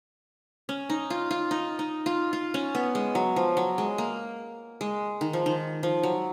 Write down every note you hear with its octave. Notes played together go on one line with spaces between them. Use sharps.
C#4
D#4
F4
F4
D#4
D#4
F4
F4
C#4
B3
G#3
F#3
F3
F#3
G#3
A#3
G#3
D#3
F3
D#3
F3
F#3